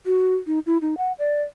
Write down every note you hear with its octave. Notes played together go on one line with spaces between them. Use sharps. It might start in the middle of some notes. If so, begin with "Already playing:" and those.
F#4
D#4
E4
D#4
F#5
D5